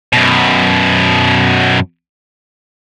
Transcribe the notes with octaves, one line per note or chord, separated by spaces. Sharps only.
F#2 B2